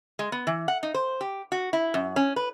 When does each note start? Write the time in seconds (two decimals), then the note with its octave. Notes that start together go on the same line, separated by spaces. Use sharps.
0.19 G#3
0.32 B3
0.47 E3
0.68 F#5
0.83 D#4
0.94 C5
1.21 G4
1.52 F#4
1.73 E4
1.94 F#2
2.16 C#4
2.36 B4